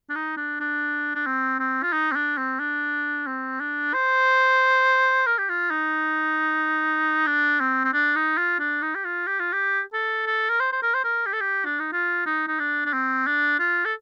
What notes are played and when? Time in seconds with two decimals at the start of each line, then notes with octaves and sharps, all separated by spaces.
0.10 D4
0.15 D#4
0.37 D4
0.60 D4
1.15 D4
1.26 C4
1.59 C4
1.83 F4
1.93 D#4
2.11 C4
2.15 D4
2.37 C4
2.59 D4
3.27 C4
3.60 D4
3.94 C5
5.26 A#4
5.38 G4
5.49 F4
5.71 D#4
7.27 D4
7.60 C4
7.85 C4
7.93 D4
8.16 D#4
8.38 F4
8.60 D4
8.82 D#4
8.95 G4
9.05 F4
9.27 G4
9.40 F4
9.53 G4
9.94 A4
10.27 A4
10.49 A#4
10.60 C5
10.73 C5
10.83 A#4
10.94 C5
11.04 A#4
11.26 G4
11.33 A4
11.41 G4
11.65 D4
11.80 D#4
11.93 F4
12.26 D#4
12.48 D#4
12.60 D4
12.85 D4
12.93 C4
13.27 D4
13.59 F4
13.85 A4